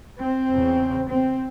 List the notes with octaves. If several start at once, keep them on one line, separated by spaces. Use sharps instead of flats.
C4
E2 C#3
C4